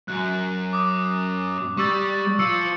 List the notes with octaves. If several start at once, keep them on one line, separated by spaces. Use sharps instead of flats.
F#2 F#6
D6 D#6
G3 C#6 E6 A6
F3 E6 C#7